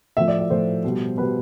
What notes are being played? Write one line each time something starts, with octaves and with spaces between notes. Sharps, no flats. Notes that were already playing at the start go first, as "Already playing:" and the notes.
A2 F3 E5
D5
E5
A2 F3 C5
B2 G3
B2 G3 B4